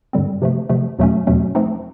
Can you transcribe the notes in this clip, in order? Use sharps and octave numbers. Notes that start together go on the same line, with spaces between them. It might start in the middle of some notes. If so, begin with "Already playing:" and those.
G2 D3 G3 C4
C3 F3 A3
C3 F3 A3
E2 B2 F#3 A3 C#4
E2 B2 F#3 A3 C#4
F3 A3 C4 D#4